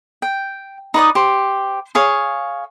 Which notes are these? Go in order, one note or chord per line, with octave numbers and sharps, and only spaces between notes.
G5
D#4 B4 D5 D#6
G4 C5
G#4 C#5 F5